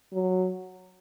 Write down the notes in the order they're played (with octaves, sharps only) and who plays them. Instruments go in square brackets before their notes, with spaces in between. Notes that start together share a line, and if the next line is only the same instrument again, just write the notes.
[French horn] F#3